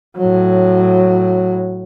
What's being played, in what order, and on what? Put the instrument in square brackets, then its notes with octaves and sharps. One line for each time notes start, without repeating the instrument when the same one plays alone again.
[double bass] A2 F#3